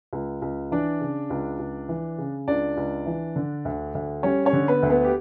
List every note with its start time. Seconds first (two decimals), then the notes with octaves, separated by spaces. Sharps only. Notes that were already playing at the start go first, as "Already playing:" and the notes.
0.13 C#2
0.42 C#2
0.71 E3 D4 D5
1.01 C#3
1.30 C#2
1.59 C#2
1.89 E3
2.18 C#3
2.48 C#2 D4 D5
2.77 C#2
3.06 E3
3.36 D3
3.65 D2
3.95 D2
4.23 G3 C#4 C#5
4.45 C#4 C#5
4.53 D3
4.68 B3 B4
4.83 D2
4.90 B3 B4
5.05 G4